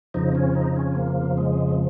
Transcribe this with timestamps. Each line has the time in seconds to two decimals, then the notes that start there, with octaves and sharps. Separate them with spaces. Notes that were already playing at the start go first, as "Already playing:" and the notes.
0.14 F2 C#3 F3 D#4
0.35 C#4
0.55 D#4
0.76 C#4
0.96 A#3
1.38 G#3